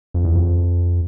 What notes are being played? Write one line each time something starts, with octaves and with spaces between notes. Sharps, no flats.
F2
E2
F2